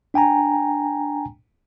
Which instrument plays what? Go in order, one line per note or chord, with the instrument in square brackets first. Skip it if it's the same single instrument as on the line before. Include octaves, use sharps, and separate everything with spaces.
[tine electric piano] D4 G5 G#5 A#5